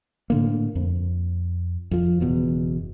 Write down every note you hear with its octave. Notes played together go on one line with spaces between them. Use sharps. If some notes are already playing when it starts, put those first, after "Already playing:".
A2 D3 A#3
F2
F2 F3
F#1 E2 B2